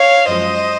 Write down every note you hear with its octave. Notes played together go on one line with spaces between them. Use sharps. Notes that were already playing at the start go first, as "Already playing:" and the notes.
Already playing: C#5 F5
F#2 F3 G#3 C5 D#5